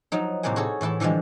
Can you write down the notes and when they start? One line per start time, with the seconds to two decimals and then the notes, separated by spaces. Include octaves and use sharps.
0.12 F3 F#3 D#4
0.43 A2 C3 G3 A#3 F#5 G#5
0.56 F#4 G#4 A4 C#5
0.81 A2 E3 E4 A4
1.00 D3 E3 F3 G3 G#3